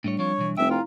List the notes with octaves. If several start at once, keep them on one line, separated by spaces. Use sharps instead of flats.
A2 G3 A3 D4 C#5
F3 C4 F4 C#5
B1 E3
F1 E5 G5
E4 F4 A#5